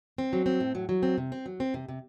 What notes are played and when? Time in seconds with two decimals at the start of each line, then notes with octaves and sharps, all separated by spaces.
0.18 C4
0.33 F#3
0.46 C4
0.60 A2
0.75 F#3
0.89 F#3
1.03 C4
1.18 C3
1.32 C4
1.46 F#3
1.60 C4
1.74 C3
1.89 C3